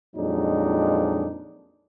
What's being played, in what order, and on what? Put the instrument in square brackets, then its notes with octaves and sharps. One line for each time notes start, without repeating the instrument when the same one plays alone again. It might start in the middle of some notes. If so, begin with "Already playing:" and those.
[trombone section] F2 A#2 F#3 G#3 D4 D#4